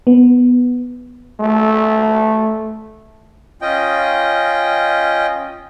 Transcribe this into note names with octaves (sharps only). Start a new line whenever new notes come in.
B3
A3
C#4 F4 D#5 G5